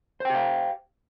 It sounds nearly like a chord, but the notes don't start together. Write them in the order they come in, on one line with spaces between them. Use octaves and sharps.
C5 G5 G4 F5